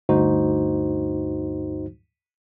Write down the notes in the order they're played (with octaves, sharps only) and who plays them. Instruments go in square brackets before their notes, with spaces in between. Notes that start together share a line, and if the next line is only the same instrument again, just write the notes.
[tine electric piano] D2 G2 D#4 F#4 C5